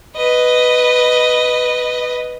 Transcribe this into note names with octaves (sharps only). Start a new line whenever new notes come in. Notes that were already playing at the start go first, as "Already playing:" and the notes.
B4 D#5